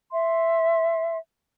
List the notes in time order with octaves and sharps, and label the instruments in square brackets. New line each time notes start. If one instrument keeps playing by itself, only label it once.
[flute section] E5 C6